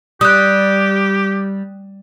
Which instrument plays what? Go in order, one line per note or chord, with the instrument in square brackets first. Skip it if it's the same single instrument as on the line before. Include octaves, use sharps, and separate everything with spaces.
[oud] G3 [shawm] G4 [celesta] D#6 F#6